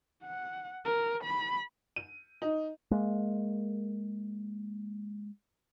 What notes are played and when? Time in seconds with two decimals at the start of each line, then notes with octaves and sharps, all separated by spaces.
0.24 F#5
0.85 A#4
1.24 B5
1.96 D#7
2.42 D#4
2.91 G#3 A#3